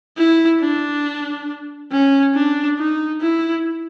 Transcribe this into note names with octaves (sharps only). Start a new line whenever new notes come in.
E4
D4
C#4
D4
D#4
E4